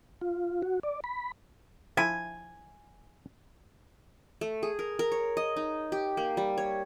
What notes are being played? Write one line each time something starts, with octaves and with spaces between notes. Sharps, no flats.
F4
F#4
D5
B5
F3 E4 G#5
A3
G#4
A#4
A#4
C#5
D#5
D#4
G4
A#3
G3
C#5